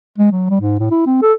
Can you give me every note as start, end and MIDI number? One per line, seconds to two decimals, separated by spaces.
0.18 0.30 56
0.32 0.47 54
0.50 0.58 55
0.61 0.79 44
0.79 0.87 45
0.91 1.06 64
1.06 1.18 60
1.22 1.33 69